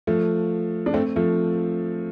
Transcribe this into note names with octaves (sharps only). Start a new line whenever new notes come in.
F3 A3
D4
A3 C4
F3 A3